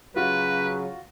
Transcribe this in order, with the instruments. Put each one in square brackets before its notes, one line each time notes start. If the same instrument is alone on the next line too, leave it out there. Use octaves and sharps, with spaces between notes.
[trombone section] C#3 F#3 [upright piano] F4 F#4 [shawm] B4